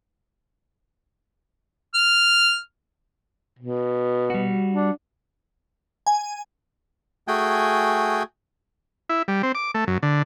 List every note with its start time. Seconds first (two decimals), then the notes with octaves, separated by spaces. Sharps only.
1.95 F6
3.59 B2
4.30 G3 F#4
4.73 D4
6.07 G#5
7.28 A3 F#4 G#4 G5 G#5
9.09 E4
9.28 G3
9.43 C4
9.55 D6
9.74 A3
9.87 F#2
10.03 D3